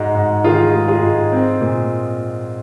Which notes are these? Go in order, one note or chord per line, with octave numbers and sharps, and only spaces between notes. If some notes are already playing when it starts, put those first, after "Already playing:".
Already playing: G#2 G#3 F#4
G#2
D#3 F4 G#4
G#3
F4 G#4
G#2
C4
A#2